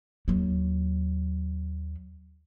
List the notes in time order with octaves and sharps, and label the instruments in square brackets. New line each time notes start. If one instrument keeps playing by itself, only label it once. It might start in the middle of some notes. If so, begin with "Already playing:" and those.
[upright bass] D#2 F#3